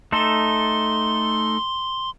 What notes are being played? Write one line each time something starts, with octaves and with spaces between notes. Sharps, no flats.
A3 D#4 A4 C6